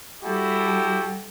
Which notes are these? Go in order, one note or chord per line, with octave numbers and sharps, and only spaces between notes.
G3 E4 F#4 G4 A4